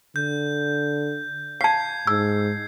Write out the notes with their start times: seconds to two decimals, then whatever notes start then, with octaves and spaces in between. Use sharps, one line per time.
0.16 D3 G6
1.61 F5 A5 G#6 C7
2.07 G#2 E6